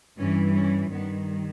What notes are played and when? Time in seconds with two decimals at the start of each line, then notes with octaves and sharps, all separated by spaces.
0.18 G2 E3 G3 C#4
0.55 C#4
0.91 G2 D#3 G3 B3